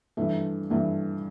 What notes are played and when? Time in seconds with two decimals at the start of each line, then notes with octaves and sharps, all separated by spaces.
0.17 G2 E3 A3
0.70 G2 E3 A3